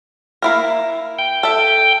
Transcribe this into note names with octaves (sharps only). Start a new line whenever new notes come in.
A#3 E4 A#4
G5
A4 E5